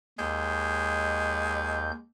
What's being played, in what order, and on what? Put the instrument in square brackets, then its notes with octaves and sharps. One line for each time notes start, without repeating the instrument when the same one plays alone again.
[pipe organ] D#2 G6 [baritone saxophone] G#3